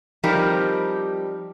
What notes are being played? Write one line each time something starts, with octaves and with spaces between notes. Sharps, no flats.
F3 G3 C4 D#4 G4 A#4